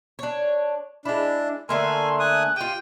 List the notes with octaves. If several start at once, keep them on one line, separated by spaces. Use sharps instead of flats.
D4 C#5
G#3 D4 E4
D3 A3 A#3 G#5 C6
G#5 D#6 F#6
F4 G4 G5 D#7